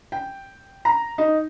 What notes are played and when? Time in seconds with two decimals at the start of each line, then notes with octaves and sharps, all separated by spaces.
0.12 G5
0.85 A#5
1.18 D#4